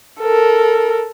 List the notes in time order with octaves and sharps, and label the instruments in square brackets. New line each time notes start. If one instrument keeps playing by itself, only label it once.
[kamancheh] A4 A#4